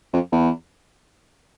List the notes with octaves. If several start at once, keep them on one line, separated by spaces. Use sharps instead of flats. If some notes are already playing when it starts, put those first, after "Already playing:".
F2
E2